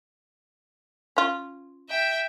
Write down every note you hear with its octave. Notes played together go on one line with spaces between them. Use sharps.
C#4 F4
E5 G5